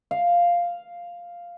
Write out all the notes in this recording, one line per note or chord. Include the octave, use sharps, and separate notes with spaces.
F5